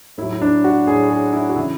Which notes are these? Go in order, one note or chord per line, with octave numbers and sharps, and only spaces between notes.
A2 F#3 E4
E4
D4
F#4
A2 F#3 G#4
G#4
E4
F#4
C#3 E3 E4